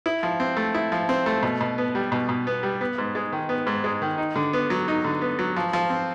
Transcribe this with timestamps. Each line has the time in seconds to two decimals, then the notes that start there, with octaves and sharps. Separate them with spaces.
0.06 E4
0.23 F3
0.40 C4
0.57 A3
0.75 E4
0.92 F3
1.09 C4
1.26 A3
1.43 B2
1.61 B2
1.78 B3
1.95 G3
2.12 B2
2.29 B2
2.47 B3
2.63 G3
2.81 B3
2.98 G#2
3.15 G#3
3.33 D#3
3.49 B3
3.67 G#2
3.84 G#3
4.02 D#3
4.18 D#4
4.36 D3
4.53 B3
4.70 F#3
4.88 D#4
5.05 D3
5.21 B3
5.39 F#3
5.56 F3
5.73 F3
5.90 C4